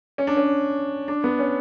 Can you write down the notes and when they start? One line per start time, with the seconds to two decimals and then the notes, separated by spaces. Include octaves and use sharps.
0.18 C#4
0.27 D4
0.37 C#4
1.08 D4
1.24 B3
1.39 C#4